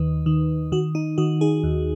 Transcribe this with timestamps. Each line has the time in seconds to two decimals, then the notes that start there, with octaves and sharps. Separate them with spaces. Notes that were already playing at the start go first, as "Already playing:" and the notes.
Already playing: D#2 D#3 D#4 B4
0.26 D#3
0.72 D#3 F#4
0.95 D#4
1.18 D#3 F#4
1.41 D#4 G#4
1.63 D#2